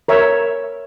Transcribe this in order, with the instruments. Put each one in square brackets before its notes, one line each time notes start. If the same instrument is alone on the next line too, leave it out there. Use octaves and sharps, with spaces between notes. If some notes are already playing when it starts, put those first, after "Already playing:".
[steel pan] A#4 C#5 E5